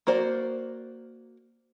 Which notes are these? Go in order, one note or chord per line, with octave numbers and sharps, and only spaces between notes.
A#3 F#4 C5 D5